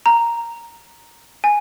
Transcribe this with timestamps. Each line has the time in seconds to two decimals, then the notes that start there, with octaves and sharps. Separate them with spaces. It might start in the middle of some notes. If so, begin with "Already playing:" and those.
0.06 A#5
1.44 G#5